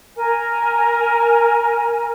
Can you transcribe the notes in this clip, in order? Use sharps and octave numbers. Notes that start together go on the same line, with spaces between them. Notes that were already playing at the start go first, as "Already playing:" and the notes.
A#4 G#5